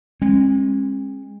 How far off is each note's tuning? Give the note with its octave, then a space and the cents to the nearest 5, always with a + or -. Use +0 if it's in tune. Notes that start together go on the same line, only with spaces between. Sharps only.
G#3 -15 C#4 -45